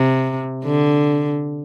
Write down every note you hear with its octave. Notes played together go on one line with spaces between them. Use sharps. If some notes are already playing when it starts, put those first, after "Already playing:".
Already playing: C3
D3